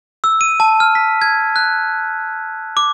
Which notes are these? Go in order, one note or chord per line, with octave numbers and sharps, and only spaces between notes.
E6
D#7
A5
F6
B6
G#6
F#6
D6